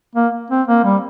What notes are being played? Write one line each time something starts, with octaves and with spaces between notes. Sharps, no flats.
A#3
C4
A#3
G3